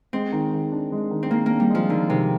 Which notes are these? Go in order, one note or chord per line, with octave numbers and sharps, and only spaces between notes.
G#3 C4
D#3
D#3
D4
G#3
D#3
C4
D#3 A#3
A#3 D4
G3
F3 G#3
D3 D#3
C3 D#3